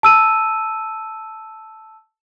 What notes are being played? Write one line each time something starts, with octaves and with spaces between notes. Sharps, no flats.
A5 E6 D#7